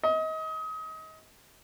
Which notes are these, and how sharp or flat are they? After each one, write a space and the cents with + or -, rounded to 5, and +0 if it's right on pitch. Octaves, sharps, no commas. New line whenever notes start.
D#5 +30